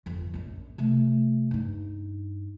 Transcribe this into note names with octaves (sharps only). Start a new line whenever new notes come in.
G1 F2
A#1 F#2
C3 A3
G2 D#4